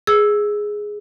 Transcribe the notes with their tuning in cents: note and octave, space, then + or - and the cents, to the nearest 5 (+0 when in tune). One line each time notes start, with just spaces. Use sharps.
G#4 +0 E6 +0